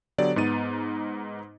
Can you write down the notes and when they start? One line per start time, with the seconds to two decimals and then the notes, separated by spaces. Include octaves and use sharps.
0.18 D3 F#3 B3 G4 D5
0.36 G#2 B3 D#4 A6 D#7